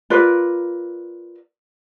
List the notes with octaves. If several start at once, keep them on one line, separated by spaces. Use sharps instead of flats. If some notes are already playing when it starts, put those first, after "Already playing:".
F4 A#4 B4 D5